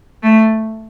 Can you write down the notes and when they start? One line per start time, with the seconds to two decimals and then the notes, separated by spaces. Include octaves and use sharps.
0.23 A3